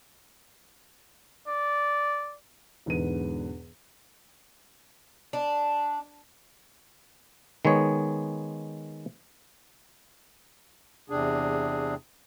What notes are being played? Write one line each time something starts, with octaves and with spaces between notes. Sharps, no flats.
D5
E1 E2 G#2 D3 B4 D#7
D4
D#3 G#3 B3 C#5
E2 C3 D4 G#4